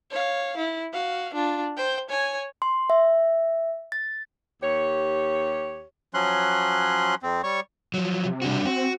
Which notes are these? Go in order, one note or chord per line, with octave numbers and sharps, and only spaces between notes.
C#5 F5
E4
F#4 F5
D4 F4
C5 G5
C#5 G#5
C6
E5
A6
D#2 G4 C#5
F3 F#3 C#4 C6 F#6
F2 C4
G3 C#5 C#6
F3 F#3
C3
G3 D4 F#4
C4 F#4